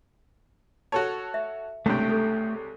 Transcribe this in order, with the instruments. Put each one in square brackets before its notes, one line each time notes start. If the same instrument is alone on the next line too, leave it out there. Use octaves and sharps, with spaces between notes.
[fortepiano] F#4 A4 C#5 [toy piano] A5
[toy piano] E5
[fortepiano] C#2 G2 C3 [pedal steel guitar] A3 G5
[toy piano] A4